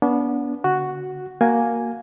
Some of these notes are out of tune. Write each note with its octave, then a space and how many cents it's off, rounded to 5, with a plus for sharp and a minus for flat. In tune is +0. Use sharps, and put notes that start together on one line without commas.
B3 -25 D4 -35
D3 -30 F#4 +0
A#3 +0 F#4 +0 G#5 +0